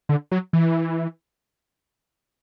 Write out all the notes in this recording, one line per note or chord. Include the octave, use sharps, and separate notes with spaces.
D3
F#3
E3